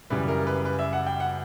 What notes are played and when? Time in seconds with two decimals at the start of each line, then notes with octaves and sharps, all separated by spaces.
0.10 F#2 C#3 E3 G3 B4
0.28 A#4
0.47 B4
0.65 B4
0.79 E5
0.93 F#5
1.07 G5
1.20 F#5